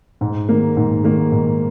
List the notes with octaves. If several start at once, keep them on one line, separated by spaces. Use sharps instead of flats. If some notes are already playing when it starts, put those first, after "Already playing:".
G#2
D#3 A#3
G#2
D#3 A#3
G#2